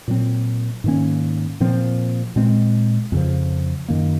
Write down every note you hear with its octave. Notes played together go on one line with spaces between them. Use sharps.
A#2 F#3 C4
G#2 D#3 A#3 C#4
A#2 F3 C4
A#2 G#3 C4
F2 C#3 F3
F#2 D#3 A#3